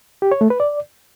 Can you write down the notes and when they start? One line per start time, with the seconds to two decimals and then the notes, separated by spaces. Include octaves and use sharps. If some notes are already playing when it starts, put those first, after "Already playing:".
0.22 G4
0.32 C#5
0.41 A3
0.50 B4
0.60 D5